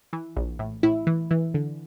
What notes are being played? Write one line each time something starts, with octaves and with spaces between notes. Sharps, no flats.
E3
A#1
A2
A2 E4
E3
E3
D3